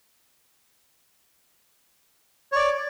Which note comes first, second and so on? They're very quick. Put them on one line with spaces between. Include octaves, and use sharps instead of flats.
C#5 D5 D6